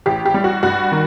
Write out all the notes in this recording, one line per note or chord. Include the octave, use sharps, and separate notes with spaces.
A1 G4
G4
G3
F#4
G2 F#4
D#3